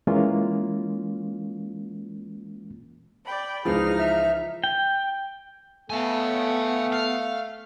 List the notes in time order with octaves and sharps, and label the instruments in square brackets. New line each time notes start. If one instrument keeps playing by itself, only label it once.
[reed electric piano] E3 G#3 A#3 C#4 F4
[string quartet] D5 G5 B5
[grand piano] C#2 E3 F3 [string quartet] D#4 F6 [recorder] G#4
[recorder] E5
[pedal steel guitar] G5
[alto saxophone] A3 [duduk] B3 [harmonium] A4 [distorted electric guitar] F5 G#5
[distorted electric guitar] F5